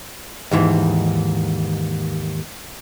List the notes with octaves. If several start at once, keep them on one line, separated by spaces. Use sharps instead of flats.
D#2 G#2 E3